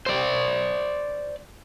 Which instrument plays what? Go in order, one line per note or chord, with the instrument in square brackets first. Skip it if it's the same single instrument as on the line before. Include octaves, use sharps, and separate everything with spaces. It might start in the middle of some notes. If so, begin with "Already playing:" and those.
[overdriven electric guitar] C5 D5